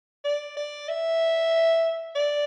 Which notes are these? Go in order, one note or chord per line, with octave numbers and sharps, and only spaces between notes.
D5
D5
E5
D5